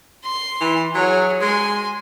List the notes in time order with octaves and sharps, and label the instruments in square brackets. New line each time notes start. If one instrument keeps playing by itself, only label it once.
[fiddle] C6
[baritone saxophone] E3
[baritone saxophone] F#3 [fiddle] G#4 C#5
[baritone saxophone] G#3 [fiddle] G#5 C6